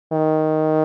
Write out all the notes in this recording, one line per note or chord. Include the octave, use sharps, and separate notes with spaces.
D#3